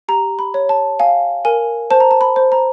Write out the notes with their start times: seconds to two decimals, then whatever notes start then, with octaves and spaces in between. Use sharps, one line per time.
0.08 G4 A#5
0.39 B5
0.54 C#5
0.69 A5
0.99 F5 G#5
1.45 A#4 G#5
1.90 C5 A5
2.00 A#5
2.11 A5
2.21 B5
2.36 C5
2.52 A#5